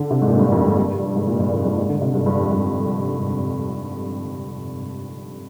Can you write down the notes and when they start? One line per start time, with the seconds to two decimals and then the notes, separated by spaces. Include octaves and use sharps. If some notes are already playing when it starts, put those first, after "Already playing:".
Already playing: D3
0.11 C3
0.22 G#2
0.28 A#2
0.33 G#2
0.39 G2
0.52 F2
0.59 G#2
0.65 G2
0.77 G2
1.16 G#2
1.27 A#2
1.40 G2
1.52 F2
1.65 G2
1.77 G#2
1.89 D3
2.01 C3
2.14 G2
2.26 G2
2.39 F2
2.51 G2